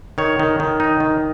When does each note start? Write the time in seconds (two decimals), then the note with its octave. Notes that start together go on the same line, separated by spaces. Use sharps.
0.18 D#3 C#5
0.40 D#3
0.60 D#3
0.80 D#4
1.00 D#3